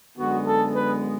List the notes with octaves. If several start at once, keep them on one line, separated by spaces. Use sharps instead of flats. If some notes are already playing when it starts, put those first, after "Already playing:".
F#2 D3 G#3 B3 F#4
A4
B4